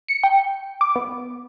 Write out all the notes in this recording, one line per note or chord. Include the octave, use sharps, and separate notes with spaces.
C#7
G5
D6
B3